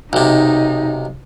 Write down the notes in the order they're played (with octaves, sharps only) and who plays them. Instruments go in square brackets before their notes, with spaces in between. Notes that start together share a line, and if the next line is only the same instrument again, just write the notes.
[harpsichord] B1 C3 [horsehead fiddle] D#4